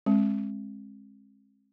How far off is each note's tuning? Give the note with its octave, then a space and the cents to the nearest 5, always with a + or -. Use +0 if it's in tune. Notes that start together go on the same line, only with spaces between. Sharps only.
G#3 +0 C4 +40